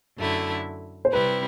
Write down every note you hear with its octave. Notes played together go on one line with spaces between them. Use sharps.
F#2 D3 A3 E4
C5
C3 G3 C4 E4 B4